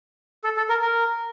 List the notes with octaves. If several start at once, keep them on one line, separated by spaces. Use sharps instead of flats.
A4
A4
A#4
A#4